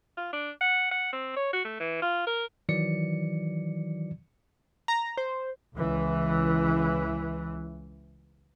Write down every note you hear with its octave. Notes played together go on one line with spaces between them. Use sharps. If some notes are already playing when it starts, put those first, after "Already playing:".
F4
D4
F#5
F#5
C4
C#5
F#4
A3
E3
F4
A#4
D#3 E3 F#3 D5 C#7
A#5
C5
C#2 E3